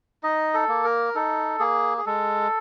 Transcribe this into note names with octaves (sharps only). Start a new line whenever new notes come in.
D#4 D#5
A4
A#3
A#4
D#4 A4
A#3 G#4
G#4
G#3 A4